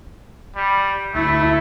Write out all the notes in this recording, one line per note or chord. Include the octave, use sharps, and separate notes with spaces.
G3
D2 A3 E4